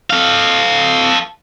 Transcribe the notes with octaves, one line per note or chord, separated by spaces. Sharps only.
A4 F5